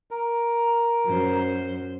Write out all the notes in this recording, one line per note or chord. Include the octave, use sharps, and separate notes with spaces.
A#4
F#2 C5